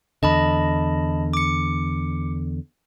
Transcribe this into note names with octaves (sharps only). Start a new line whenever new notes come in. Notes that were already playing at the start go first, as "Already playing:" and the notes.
E2 D3 D#5 A5 B5
D6 C#7